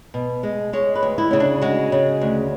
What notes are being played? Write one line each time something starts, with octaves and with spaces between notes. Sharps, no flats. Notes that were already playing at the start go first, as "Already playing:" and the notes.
B2
G#3
G#3 C#5
B4
D2
E4
C#3 C#4
D4
G#3 F#4
C#3
D2